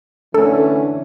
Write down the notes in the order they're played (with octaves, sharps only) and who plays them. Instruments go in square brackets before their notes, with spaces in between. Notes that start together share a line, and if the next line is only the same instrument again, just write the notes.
[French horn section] D3 E3 A3 [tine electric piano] C#4 D4 [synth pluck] A4